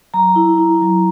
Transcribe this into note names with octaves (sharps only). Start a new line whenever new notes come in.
F#3 A#5
E4
E4
F#3